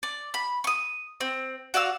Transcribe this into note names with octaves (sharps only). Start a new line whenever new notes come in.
D5
B5
C#6 D#6
C4
F#4 D5 F5 E6